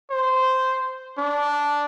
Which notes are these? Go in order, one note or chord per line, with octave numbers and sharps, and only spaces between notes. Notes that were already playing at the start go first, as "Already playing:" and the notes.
C5
D4